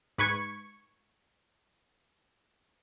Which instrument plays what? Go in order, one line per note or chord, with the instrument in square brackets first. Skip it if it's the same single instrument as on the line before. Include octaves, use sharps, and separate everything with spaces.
[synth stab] G#2 B4 C#6 G#6 C#7